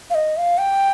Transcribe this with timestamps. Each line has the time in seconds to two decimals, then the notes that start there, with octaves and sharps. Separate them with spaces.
0.10 F5
0.15 D#5
0.37 F5
0.58 G5